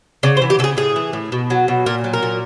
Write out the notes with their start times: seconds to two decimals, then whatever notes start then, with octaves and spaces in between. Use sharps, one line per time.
0.23 C#3 D5
0.37 C5
0.42 E3
0.50 G4
0.59 C#3 A4
0.64 G#4
0.77 A2 G#4
0.96 E3
1.13 A2
1.32 B2
1.50 F#3
1.68 B2
1.86 A#2 A#4
2.04 F#3
2.13 A#4
2.23 A#2